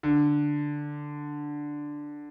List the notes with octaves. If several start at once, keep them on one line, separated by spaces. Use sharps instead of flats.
D3